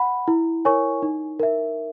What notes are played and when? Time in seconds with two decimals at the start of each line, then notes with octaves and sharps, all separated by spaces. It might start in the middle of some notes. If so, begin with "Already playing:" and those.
Already playing: F#5 B5
0.28 E4
0.65 A#4 C#5 G#5 C#6
1.02 D#4
1.40 A#4 E5